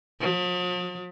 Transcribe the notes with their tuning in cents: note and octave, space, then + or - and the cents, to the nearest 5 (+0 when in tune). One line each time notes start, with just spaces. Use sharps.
F3 +45